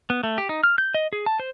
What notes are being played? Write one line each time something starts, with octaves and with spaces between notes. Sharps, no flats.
B3
A3
G4
D#4
F6
G6
D#5
G#4
A5
C5